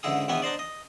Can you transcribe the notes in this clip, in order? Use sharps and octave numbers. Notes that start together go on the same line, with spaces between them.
C#2 G#2 D3 E4 G#4 D#6
A#1 D#3 E3 B3 B4 G#5
D4 D#4 C5 D5
D#5